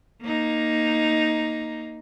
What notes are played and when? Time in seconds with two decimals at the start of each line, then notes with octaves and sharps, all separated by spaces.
0.23 A#3 D#4